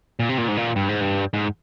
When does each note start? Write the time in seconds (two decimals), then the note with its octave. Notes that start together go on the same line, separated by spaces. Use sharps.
0.20 A#2
0.29 C3
0.38 A#2
0.48 G#2
0.57 A#2
0.76 G2
0.89 G#2
1.01 G2
1.34 G#2